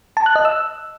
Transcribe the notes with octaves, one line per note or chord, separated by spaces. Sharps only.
A5
F#6
D#5
E6